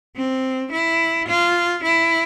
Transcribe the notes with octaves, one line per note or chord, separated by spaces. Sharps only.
C4
E4
F4
E4